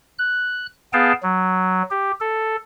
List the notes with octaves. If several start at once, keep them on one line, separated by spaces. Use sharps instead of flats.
F#6
B3 G#4 F5 G5 A5
F#3
G4
A4